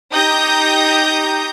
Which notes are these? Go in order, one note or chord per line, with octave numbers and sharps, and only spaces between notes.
D#4 G4 D#6 G6 A#6